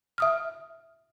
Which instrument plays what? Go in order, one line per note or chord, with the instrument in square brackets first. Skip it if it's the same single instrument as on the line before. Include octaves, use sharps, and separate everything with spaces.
[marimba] E5 D#6 F6